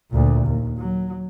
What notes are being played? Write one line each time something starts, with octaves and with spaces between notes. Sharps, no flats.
D2 A#2
D#2
F#3